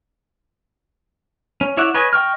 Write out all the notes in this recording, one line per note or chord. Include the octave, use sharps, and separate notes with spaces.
C#4
E4 C#5 D5 E5 F#5
B4 C#5 D#5 G#5
D#5 G5 C#6 F6